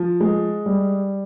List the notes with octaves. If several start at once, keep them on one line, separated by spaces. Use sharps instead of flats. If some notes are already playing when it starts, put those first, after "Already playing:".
Already playing: F3
G#3
G3